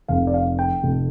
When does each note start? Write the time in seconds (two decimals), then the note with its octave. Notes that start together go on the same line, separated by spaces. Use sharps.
0.08 F1 F2 C3 F5
0.27 D5
0.34 F5
0.59 G5
0.83 F1 F2 C3 A3